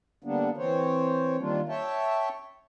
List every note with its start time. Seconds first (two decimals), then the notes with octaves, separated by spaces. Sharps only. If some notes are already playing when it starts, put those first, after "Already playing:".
0.24 D3 G3 A#3 B3 D4
0.57 E3 C4 C5 C#5
1.39 D#3 G3 A#3 D4 F4
1.69 C#5 E5 G5 A5